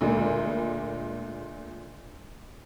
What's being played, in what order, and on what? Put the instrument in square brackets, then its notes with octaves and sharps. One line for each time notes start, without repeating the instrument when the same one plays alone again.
[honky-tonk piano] D2 A#2 G#3